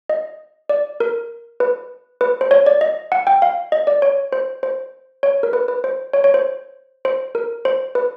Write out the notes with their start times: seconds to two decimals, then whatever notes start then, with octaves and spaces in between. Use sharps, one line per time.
0.10 D#5
0.69 D5
1.00 A#4
1.60 B4
2.21 B4
2.41 C5
2.51 C#5
2.66 D5
2.81 D#5
3.12 F#5
3.27 G5
3.42 F5
3.72 D#5
3.87 D5
4.02 C#5
4.32 C5
4.63 C5
5.23 C#5
5.43 A#4
5.53 B4
5.68 B4
5.84 C5
6.13 C#5
6.24 C#5
6.34 C5
7.05 C5
7.35 A#4
7.65 C5
7.95 B4